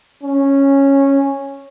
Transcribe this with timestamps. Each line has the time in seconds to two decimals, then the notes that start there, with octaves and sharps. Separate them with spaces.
0.23 C#4